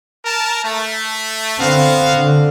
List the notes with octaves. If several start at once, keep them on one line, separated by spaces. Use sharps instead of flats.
A#4 A5
A3
D3 B3 C4 F#4 F5
D3